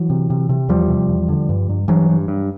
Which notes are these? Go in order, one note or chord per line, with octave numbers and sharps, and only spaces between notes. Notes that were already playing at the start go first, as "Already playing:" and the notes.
Already playing: E3 F#3
C3
C3
C3
E2 F3 G3
C3
E2
D3
G2
G2
G2 E3 F#3
G2
G2